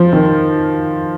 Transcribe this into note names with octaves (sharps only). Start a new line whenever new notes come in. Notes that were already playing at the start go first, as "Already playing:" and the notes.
Already playing: F3
D#3